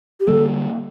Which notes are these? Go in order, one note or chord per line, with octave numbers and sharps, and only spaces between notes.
G4
D3 G3 A#3 A4